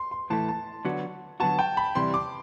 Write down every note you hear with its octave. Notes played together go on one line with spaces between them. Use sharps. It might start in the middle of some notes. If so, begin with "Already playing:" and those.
Already playing: C6
C6
A2 E3 A3 A5
A5
D3 F#3 B3 F#4
D3 F#3 B3 F#4 A5
G5
B5
C3 E3 G3 C4 C6
D6